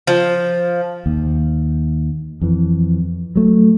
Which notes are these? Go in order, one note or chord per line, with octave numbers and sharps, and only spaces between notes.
F3
D#2
F2 E3
F#3 A3